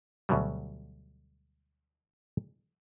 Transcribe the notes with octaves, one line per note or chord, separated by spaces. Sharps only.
D2 B2 F#3 G3